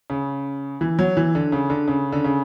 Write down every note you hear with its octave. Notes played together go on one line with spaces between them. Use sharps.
C#3
E3
F#3
E3
D3
C#3
D3
C#3
D3
C#3